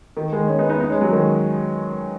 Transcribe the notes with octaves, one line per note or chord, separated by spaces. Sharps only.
D#3
D#3 G#3
G#3 C#4
B3 D#4
B3 D#4
B3 D#4
G#3 C#4
F#3
D#3 G#3